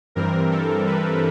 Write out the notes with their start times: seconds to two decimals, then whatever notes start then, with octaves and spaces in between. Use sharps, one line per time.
0.15 G2 E3 G3 C4 A#4
0.51 A4
0.87 B4